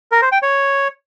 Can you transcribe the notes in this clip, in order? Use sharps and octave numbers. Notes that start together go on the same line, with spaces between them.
A#4
C5
G5
C#5